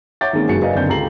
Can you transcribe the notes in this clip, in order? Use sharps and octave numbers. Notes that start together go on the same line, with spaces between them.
C#5 E5 F#5 D6 G6 A6
D#3 G#3 A#3 C4 C#4
F#1 F#2 G#3 F#4 C#7
A#4 B4 D5 D#5 F5 G#5
F#1 D3 C4 G6
C#2 G4 A4 A#5 C7 F#7